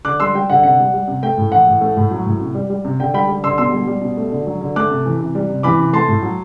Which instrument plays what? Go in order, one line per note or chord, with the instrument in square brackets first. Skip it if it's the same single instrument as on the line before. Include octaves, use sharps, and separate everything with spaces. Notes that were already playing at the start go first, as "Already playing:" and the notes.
[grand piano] D3 D6 F#6
G3 C6 E6
G3 G5
D3 F#5
C3 F#5
G3
G3
C3
A3 G5
A2
E3 F#5
A2
A3
A2
F#3
A2
C3
G3
G3
C3
D3 G5
G3 G5 B5
G3
D3 C6 E6
B2 C6 E6
G3
G3
B2
A3
D3
F#3
D3
A3 D6 F#6
C3
E3
C3
G3
C3
E3 B5 D6
C3
A3 A5 C6
A2
F#3